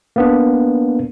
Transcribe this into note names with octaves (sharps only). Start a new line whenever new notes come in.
A#3 B3 D4